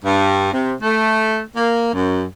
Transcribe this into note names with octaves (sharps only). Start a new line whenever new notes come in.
G2
C3
A3
A#3
F#2